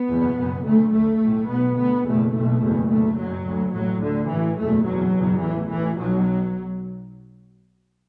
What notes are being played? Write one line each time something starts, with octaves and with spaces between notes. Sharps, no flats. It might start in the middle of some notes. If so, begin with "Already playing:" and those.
Already playing: B3
F#1 E2 B2
F#1 F#2
D2 A3
D2 A3
B1 A2
B1 B2 B3
D2 B3
F#1 E2 B2 A3
B1 B2 A3
F#1 E2 B2
D2 A3
F#1 F#2 F#3
D2
A1 A2 F#3
D2 D3
A1 A2 E3
F#1 E2 B2 A3
F#1 E2 B2 F#3
F#1 E2 B2
A1 A2 E3
A2 E3
A1
B1 B2 F#3